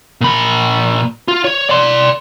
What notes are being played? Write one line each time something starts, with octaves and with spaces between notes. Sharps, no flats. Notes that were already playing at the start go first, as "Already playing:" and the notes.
A#2 B5
F4
C#5
D5 C6